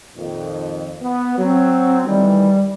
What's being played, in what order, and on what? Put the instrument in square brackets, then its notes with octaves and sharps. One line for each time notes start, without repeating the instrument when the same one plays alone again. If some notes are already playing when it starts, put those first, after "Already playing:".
[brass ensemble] F2 A#2 D#3
B3
[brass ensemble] F#3 [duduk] C4
[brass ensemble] D2 D#3 E3 [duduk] G3